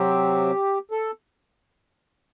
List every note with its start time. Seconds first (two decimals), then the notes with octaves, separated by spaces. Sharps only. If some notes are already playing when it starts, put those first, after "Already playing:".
Already playing: C3 F#3 C4 G4
0.91 A4